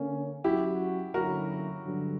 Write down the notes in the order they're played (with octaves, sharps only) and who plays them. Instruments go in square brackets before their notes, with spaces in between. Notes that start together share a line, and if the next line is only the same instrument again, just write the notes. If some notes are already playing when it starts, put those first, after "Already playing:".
Already playing: [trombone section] D3 A#3 C#4
[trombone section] F#3 C#4 F#4 [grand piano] E4 G4
[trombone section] D3 F#3 A#3 C#4 E4 [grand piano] F#4 A#4
[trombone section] G2 D3 F#3